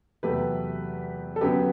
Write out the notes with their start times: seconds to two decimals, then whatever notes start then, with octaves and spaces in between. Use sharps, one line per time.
0.23 E2 C3 F#3 A3 G4 B4
1.36 A4
1.41 F#2 D3 F#3 B3 G4 B4